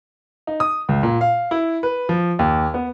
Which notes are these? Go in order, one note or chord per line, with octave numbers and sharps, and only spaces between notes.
D#4
D#6
C#2
A#2
F5
E4
B4
F3
D#2
B3